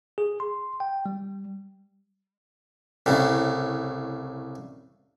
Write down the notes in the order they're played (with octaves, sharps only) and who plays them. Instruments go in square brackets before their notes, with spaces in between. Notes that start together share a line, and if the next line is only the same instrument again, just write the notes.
[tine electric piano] G#4
C6
G5
G3
[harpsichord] C2 A2 C#3